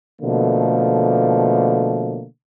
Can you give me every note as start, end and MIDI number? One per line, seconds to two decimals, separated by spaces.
0.22 2.25 47
0.22 2.25 50
0.22 2.25 53
0.22 2.25 57
0.22 2.25 58